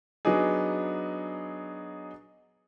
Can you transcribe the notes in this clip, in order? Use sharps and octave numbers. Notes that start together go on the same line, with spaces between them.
F#3 B3 D4 D#4 G#4